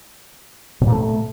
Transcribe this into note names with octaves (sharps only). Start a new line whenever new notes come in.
B2
A#2
A3